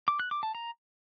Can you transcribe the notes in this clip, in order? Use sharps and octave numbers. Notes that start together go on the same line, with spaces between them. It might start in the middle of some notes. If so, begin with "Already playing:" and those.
D6
F#6
D6
A5
A#5